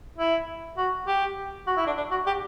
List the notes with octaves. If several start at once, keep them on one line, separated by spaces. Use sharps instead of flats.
E4
F#4
G4
F#4
E4
D4
D4
F#4
G4